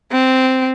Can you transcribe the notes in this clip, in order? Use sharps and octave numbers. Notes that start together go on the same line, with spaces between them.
C4